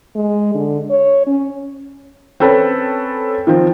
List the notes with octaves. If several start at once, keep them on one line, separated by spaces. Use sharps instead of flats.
G#3
D3
C#5
C#4
C4 C#4 A4 B4
D#3 F3 C4